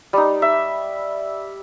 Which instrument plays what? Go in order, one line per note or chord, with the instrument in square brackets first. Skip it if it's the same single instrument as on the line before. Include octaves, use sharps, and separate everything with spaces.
[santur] G3 D#4
E5